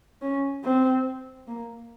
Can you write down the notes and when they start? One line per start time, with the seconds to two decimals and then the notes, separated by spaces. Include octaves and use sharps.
0.22 C#4
0.64 C4
1.48 A#3